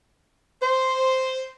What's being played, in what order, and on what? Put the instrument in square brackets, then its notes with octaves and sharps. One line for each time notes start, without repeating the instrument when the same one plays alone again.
[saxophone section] C5